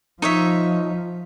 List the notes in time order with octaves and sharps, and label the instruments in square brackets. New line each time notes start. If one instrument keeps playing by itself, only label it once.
[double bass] F3 [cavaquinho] D#4 C#5 E5